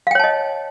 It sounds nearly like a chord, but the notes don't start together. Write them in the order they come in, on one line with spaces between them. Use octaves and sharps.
F5 G5 C#5 A5 D#5